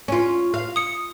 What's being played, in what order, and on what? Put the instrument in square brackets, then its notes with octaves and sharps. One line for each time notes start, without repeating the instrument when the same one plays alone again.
[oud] C#4 F4
F5
[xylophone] D#6 C#7